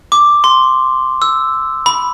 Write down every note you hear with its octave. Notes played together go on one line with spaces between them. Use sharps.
D6
C6
E6
B5